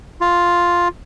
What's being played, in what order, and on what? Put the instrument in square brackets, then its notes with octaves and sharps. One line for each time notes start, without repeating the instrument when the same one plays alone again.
[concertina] F4